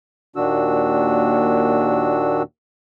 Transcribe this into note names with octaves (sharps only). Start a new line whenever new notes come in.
D#2 A#2 D#3 D4 F#4 E6